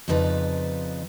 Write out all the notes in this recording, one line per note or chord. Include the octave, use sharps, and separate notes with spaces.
F2 C#3 F3 D#4 B4 D5